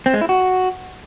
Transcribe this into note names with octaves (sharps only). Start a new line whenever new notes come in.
C4
G#3
E4
F#4